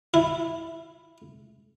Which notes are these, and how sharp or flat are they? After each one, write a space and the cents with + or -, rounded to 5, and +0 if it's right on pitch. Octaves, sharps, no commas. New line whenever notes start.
E4 +0